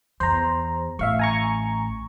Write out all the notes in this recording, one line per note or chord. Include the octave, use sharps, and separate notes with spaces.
E2 C5 A#5
A1 E5 F5 C#6
G#5 A#5 C#6